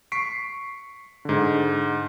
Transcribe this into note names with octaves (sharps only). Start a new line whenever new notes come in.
C#6 B6 C7 D7
G#2 D3